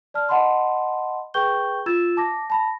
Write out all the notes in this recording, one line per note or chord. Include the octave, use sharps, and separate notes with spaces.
D5 A5 F6
D#5 F#5 A5 B5 C6
G#4 B4 G5 C#6 G6 G7
F4 E6 G#6 A6 E7
A5 D6 A#6
A5 B5 A#6